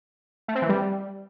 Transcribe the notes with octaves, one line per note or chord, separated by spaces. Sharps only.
A3
C4
E3
G3